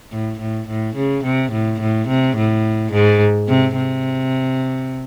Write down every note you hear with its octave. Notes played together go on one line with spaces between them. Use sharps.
A2
A2
A2
C#3
C3
A2
A2
C3
A2
G#2
C3
C3